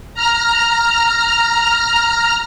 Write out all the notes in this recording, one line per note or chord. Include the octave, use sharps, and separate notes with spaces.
A#5 F6